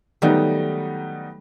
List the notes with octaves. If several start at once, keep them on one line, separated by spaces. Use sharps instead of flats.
D#3 F#3 G3 A3 B3 D#4